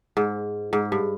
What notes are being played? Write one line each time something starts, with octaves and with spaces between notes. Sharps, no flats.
G#2
G#2
G2